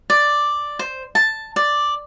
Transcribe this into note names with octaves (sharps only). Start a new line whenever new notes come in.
D5
C5
A5
D5